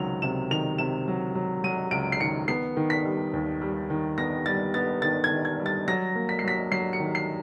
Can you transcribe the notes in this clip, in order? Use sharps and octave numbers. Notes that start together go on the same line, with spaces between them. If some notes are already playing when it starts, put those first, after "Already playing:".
Already playing: C#2 C3 D#3 F#3 F7
C3 E7
D#3 F7
C3 E7
F#3
F#3
F#3 D#7
C#2 D7
C7
D#3 C#7
B3 C7
D#3
B6
G3
D#2
G3
D#3
B3 A#6
G3 A6
B3 A6
D#3 A6
G#6
D#3
G#6
G3
A6
F#3 A#6
A#3
B6
C7
F#3 B6
F#3 C7
C#7
D#3
C7